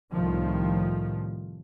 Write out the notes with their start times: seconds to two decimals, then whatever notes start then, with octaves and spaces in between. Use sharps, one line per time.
0.13 C2 A2 D#3 F3